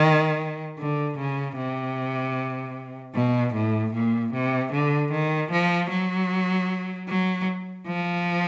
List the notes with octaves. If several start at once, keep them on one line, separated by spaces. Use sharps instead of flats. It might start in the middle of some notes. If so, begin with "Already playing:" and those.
Already playing: D#3
D3
C#3
C3
B2
A2
A#2
C3
D3
D#3
F3
F#3
F#3
F3